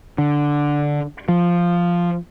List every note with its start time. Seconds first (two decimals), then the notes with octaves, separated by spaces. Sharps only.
0.18 D3
1.28 F3